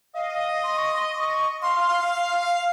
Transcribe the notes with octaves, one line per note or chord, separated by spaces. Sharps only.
D#5 F5
C6
C#6
C6
D#6
C#6
F5 C6